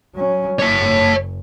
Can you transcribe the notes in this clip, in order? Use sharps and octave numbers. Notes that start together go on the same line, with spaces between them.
F#3 C#4
F#1 C#5 A5